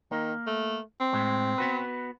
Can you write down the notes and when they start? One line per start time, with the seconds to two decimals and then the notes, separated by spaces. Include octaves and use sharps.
0.11 D#3 A#3
0.47 A3
1.00 C4
1.13 A2 G#3
1.58 B3 F#4 B4